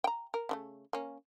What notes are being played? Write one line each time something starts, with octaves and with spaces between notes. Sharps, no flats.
G5 A#5
A#4
C#3 F3 A3
A#3 C#4